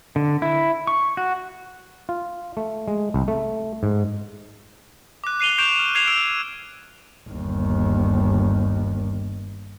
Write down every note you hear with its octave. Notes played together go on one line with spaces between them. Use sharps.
D3
E4
C#6
F#4
F4
A3
G#3
C2
A3
G#2
D6 F#6
F#6 C7 D#7 F7 G7
C#6 D6 G6 D7 E7 F7
F6
F6 F#6 G#6 C7 E7 F7
E6 D7
G1 D#2